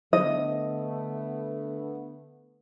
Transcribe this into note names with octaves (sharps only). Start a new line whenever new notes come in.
D3 A3 B3 D#5